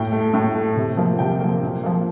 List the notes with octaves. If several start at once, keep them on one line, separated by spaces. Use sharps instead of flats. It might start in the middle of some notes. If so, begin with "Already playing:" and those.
Already playing: A2 G5
A3
A2
A3
C3
F3 A#3
C3 G5
F3 A#3
A#2
F3 A#3